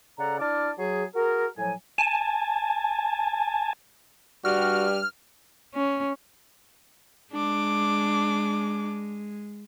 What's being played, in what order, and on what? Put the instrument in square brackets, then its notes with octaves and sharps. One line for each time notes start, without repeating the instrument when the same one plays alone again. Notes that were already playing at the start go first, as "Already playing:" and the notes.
[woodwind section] C#3 A4 D5 F#5 A#5
D4 E4 A5 D6 F6
F#3 G#4
F#4 G#4 A#4
A2 F3 F#3 G#5
[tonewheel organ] G#5 A5
[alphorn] G2 [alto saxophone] G3 [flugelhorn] F#4 [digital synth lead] F6
[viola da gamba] C#4
[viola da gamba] G#3 [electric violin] D4 D6